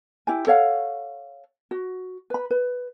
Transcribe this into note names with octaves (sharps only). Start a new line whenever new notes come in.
E4 G4 G#5
A4 C#5 F5 F#5
F#4
B4 B5
B4